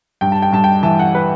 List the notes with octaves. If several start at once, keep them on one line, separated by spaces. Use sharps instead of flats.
G2 G5
A5
G5
G2 A5
G5
E3 A5
F#5
B4